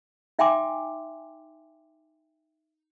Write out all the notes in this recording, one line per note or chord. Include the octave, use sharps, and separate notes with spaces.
D#4 E5 G5 G#5 C6 D6